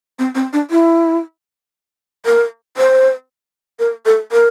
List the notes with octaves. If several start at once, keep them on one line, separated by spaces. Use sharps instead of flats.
C4
C4
D4
E4
A#4
C5
A#4
A4
A#4